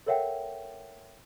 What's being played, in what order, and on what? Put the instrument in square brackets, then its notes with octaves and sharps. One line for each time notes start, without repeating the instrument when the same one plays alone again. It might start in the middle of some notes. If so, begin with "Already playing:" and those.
[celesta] A4 A#4 C#5 E5 F#5 G5